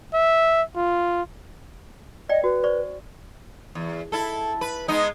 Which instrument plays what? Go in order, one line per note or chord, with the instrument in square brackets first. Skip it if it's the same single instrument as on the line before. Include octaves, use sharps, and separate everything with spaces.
[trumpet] E5
F4
[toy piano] D5 G5 [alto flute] D#5
[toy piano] F#4 [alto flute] B4
[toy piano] C5 D5 C#6
[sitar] E2
E4 A4
B4
G#3 B3 D#4